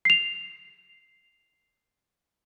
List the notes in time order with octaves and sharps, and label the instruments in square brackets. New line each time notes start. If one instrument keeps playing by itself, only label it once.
[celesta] C7 F7